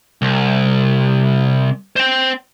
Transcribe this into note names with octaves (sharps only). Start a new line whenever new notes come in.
C2
C5 G5